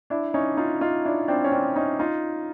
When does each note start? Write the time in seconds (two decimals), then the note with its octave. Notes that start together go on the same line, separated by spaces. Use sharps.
0.10 D4 E4
0.34 C#4 D#4
0.57 D#4 F4
0.81 D#4 F4
1.05 D4 E4
1.28 C4 D4
1.44 C#4
1.52 C4 D4
1.76 C#4 D#4
1.99 D#4 F4